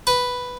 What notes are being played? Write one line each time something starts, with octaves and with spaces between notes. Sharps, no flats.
B4